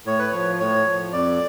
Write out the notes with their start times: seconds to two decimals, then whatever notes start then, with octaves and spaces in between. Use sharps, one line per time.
0.06 A2 C#5
0.19 B4
0.32 F3 C#5
0.60 A2 C#5
0.86 F3
1.12 F2 D5